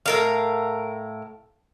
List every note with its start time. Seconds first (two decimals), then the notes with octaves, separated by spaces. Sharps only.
0.06 A2 A#4 F5